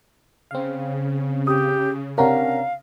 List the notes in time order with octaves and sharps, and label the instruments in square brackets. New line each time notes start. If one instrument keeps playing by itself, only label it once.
[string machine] C#3 [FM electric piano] C4 F5
[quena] G4 [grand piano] D#6
[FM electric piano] C3 C#4 D4 [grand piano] A#4 F#5 A#5 [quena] F5